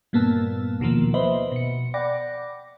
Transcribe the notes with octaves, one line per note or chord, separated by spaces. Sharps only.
G2 A#2 A#3 B3 A5 E6
D#2 B2 D#3 F3 A#3
B4 C5 D#5 E5 B5 C6
B2 C#7
D5 F#5 G5 B5 D6 A#6